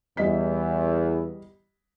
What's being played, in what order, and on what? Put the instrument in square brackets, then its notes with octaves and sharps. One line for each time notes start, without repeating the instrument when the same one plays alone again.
[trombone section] E2 [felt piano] G3 D#5 B6